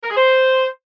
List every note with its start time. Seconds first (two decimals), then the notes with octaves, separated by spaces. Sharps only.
0.04 A#4
0.10 G#4
0.17 C5